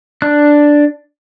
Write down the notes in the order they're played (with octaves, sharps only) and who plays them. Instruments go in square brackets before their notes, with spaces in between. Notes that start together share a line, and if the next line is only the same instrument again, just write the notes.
[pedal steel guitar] D4 F#6